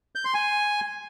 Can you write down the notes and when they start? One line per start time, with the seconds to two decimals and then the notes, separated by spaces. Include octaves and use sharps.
0.15 G6
0.25 C6
0.34 G#5